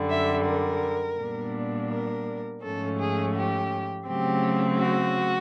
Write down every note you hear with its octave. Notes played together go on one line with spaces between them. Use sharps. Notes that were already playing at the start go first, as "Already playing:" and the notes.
Already playing: F#2 D3 G3
E5
A#4
A#2 G3 B3 D4
A#4
G#2 F3 A3 C#4 A4
G#4
G4
C#3 F#3 A3 C4 G4
F#4